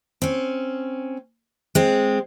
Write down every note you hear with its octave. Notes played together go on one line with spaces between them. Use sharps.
C4 C#4
G#3 C4